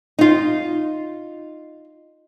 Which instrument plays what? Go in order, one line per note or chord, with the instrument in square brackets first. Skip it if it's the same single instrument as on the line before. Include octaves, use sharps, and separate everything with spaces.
[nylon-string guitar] D#4 F4